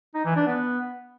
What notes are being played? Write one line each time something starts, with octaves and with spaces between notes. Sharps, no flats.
D#4
E3
D4
B3